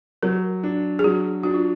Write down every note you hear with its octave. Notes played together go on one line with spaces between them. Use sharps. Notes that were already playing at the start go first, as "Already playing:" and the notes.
F#3 A#4
D4
G#4
F#3 F#4
D4 F#4
F4